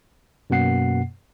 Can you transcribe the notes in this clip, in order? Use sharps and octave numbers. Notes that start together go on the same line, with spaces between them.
F#2 B2 A#3 F#5 C7